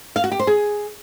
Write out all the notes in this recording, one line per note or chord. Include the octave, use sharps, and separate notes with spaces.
F5
F#4
G4
C5
G#4